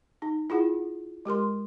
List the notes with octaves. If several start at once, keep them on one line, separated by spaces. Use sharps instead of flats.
D#4
E4 F4 G#4 F#5
G#3 G4 A#4 C6